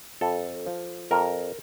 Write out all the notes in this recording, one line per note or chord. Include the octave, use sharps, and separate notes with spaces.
F2 A4
F3
F2 A#4